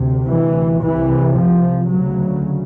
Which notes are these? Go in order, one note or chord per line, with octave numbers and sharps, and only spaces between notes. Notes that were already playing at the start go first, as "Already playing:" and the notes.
Already playing: D2 C3
E3
C2 C3 E3
F3
D2 C#3 F#3